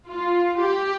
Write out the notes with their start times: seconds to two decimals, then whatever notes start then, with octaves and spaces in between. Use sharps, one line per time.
0.08 F4
0.59 G4